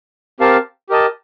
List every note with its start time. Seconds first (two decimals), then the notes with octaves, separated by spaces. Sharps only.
0.40 C4 G4 A#4 F5 A5
0.89 G4 A#4 D#5 A5